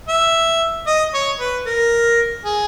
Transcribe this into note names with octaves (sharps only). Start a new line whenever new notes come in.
E5
D#5
C#5
B4
A#4
G#4